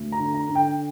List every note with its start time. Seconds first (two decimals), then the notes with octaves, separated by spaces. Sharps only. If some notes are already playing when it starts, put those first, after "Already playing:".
Already playing: D2
0.12 A#5
0.19 D3
0.34 A#5
0.49 D3
0.55 G5